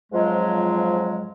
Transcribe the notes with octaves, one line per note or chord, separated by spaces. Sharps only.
F2 G#2 F3 F#3 G#3